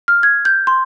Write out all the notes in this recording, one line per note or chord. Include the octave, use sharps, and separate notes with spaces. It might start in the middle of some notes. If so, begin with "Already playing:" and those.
F6
G#6
G6
C6